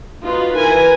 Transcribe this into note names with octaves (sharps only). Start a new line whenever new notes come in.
D#4 F4 F#4 B4
E3 A#4 B4 G#5